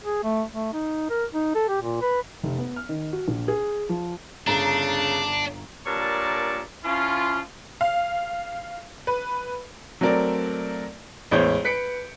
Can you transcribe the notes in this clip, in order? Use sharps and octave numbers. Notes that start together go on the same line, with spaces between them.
G#4
A3
A3
D#4
A#4
D#4
A4
G4
A#2
B4
F1
B3
F6
D#3
F#4
A#1
G#4
F3
G1 C#3 D4 A#5
G2 A#2 A#4 C#5 D5 A5
F3 C#4 E4 F4
F5
B4
F#3 A3 C4 A#4 D5
A1 E2 G#3 C5 C#5 G6
B4 B6 C#7 D7